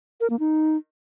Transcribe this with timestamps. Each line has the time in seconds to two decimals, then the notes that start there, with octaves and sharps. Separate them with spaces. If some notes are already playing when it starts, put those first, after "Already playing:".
0.21 A#4
0.30 A#3
0.39 D#4